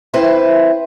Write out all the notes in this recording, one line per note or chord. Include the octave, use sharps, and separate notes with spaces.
C4 E4 B4 C5 E5